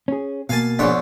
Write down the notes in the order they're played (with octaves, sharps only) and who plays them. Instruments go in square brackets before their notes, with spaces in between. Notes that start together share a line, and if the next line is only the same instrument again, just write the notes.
[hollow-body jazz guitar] C#4 G#4
[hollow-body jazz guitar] B2 A#3 [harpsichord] F5 G#5 A5
[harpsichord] E2 G#2 C#5 [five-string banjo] F3 D4